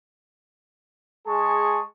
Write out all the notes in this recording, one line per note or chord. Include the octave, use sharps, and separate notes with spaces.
G#3 G#4 A5 C#6